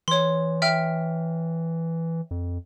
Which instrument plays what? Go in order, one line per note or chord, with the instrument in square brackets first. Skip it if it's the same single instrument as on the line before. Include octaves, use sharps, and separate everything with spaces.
[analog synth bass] E3 [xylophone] C#5 C6
[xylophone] E5 G5 F6
[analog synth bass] F2